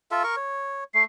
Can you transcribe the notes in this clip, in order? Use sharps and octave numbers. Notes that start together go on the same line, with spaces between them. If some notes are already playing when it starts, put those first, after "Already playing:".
F4 A4 E5
A#4 C#6
C#5
A3 C7